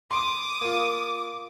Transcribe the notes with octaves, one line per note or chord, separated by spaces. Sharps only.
C6 D6 D#6 D7
A#3 F4